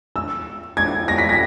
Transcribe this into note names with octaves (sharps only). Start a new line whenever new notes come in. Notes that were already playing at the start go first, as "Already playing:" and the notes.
E6
G#6
A#6
B6
A#6